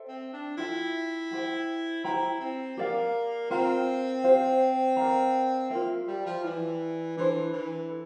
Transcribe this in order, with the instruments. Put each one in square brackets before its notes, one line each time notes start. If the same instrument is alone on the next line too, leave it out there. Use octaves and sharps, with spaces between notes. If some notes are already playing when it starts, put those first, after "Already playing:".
Already playing: [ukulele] A4 C5 E5 G5
[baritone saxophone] C4
D4
[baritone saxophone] E4 [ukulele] F4 A4 E5 G5
[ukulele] G4 C5 G5
[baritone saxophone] E4 [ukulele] G4 C5 G5 A#5
[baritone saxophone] C4
[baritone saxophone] A#3 [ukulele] G4 D5 F5
[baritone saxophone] C4 [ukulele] F4 A#4 F5 A#5
[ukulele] G4 C5 F5
A#4 D5 F5 A#5
[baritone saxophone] A#3 [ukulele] F4 C5 E5
[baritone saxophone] G3
F3
[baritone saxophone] E3 [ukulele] E4 G4 D5
[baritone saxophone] E3 [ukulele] D4 A4 C5
[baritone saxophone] E3
[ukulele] A4